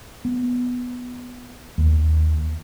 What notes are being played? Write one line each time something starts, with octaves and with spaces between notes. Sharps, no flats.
B3
D#2